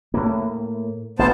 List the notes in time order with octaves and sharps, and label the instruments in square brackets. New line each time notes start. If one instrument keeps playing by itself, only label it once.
[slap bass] A2 A#3
[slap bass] A1 A3 [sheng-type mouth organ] B3 C5 A5